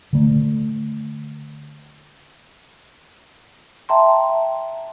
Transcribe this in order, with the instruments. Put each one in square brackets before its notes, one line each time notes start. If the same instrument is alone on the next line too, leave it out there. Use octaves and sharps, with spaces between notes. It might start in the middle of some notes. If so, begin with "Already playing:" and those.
[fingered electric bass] D3 A3
[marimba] E5 G5 A5 A#5 C6